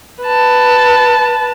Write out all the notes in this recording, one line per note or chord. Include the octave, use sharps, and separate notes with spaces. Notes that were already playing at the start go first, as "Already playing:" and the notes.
B4 A5